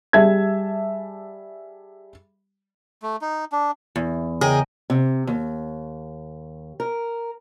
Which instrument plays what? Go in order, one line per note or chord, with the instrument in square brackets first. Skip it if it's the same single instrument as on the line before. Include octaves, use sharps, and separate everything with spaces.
[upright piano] G3 G#4 E5 A5 G#6
[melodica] A3
D#4
D4
[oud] E2
[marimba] C#3 [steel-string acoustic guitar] G#4 [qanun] A#4 D#5 G5
[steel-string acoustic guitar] C3
D#2
A#4